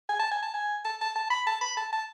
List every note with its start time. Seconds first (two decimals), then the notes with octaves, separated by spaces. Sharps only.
0.09 G#5
0.19 A5
0.31 G#5
0.42 A5
0.54 G#5
0.85 A5
1.01 A5
1.15 A5
1.30 B5
1.47 A5
1.61 B5
1.77 A5
1.92 A5